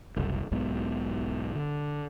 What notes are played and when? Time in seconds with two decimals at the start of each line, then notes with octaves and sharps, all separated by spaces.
0.17 F#1 C2
0.52 B1 G#2 B2
1.55 D3